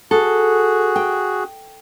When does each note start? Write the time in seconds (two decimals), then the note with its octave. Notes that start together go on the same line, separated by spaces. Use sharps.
0.11 F#4 G#4 A4
0.96 G5